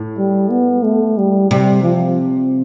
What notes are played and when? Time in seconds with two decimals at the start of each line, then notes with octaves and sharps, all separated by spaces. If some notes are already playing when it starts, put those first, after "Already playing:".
Already playing: A2
0.18 G3
0.50 B3
0.84 A3
1.18 G3
1.51 C3 G3
1.83 F3